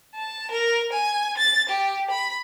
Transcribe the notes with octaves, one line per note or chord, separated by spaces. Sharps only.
A5
A#4
G#5
A6
G4
B5